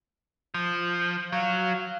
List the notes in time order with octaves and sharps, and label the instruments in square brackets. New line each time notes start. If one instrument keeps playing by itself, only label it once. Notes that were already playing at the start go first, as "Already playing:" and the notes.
[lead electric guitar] F3
[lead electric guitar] F#3 [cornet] F5